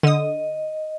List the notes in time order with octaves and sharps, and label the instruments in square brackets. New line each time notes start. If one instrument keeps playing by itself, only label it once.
[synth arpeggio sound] D3 D#6 [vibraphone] D#5